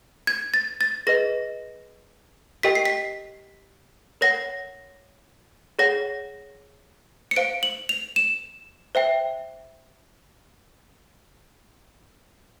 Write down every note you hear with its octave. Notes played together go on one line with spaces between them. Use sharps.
G#6
A6
A6
G#4 B4 D#5 A#6
G4 A#4 D#5 G5 B6
C7
B6
A#4 C#5 F#5 A#6
G#4 C#5 F#5 A#6
C#7
C5 F5 D7
F#7
F7
E7
C5 E5 G5